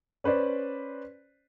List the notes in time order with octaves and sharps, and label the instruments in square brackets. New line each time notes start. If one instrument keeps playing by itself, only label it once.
[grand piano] C#4 B4 C5 D5